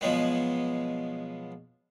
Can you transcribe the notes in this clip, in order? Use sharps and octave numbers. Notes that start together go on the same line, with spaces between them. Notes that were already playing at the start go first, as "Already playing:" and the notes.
B2 F3 F#3 G#3 B3